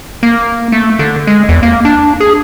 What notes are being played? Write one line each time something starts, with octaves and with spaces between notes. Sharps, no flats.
A#3
A3
D3
G#3
E2
A#3
D4
G#4